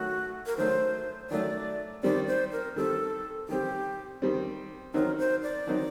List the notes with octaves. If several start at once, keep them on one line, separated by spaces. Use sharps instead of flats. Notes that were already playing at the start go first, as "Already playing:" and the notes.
Already playing: D#3 F#3 A3 F#4
A#4
D#3 F#3 A3 C5
D#3 F#3 A3 D5
D#3 G3 C4 D5
C5
A#4
D#3 G3 C4 A4
D#3 G3 C4 G4
D#3 G3 C4
D#3 F#3 C4 D#4 A#4
C5
D5
D#3 F#3 C4 D#4